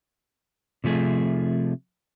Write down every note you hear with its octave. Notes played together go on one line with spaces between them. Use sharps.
C3 F3 A3 G#4